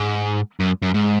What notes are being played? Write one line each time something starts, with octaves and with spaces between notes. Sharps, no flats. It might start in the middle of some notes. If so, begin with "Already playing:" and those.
Already playing: G#2
F#2
F#2
G#2